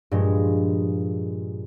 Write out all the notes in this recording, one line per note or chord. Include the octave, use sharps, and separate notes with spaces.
G2 A#2 F3 G#3